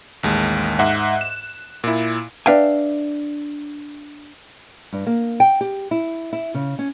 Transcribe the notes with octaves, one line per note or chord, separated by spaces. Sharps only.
A1 D#2 G#3
G#2 E5 F#5 F#6
E7
A#2 E4
D4 B4 E5 F5 G5 G#5
G2
A#3
G5
G4
E4
E4
C#3
C#4